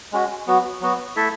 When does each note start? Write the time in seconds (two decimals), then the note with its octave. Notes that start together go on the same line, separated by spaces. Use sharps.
0.12 G#3 C#4 F#4
0.47 F#3 B3 F#4
0.81 F#3 B3 F#4
1.16 A3 E4 A4 E5